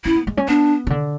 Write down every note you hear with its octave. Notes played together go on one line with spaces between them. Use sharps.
C#4 E4
B3
G#3
C#4
B3 D4
C#3
D3